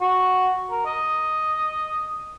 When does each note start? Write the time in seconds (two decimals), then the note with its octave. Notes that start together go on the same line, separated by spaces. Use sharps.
0.01 F#4
0.71 A#4
0.86 D#5